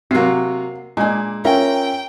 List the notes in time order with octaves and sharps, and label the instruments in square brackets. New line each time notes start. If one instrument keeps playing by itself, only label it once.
[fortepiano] C3 F#3 [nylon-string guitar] A#3 F#4 [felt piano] C7
[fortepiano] A#2 [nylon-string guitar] G#3 D4 [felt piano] D#5 G#5
[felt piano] C#4 F4 E5 [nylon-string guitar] A#4 [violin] G5